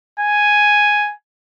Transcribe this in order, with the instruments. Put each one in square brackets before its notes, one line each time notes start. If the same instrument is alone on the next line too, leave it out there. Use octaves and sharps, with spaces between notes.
[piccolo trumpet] G#5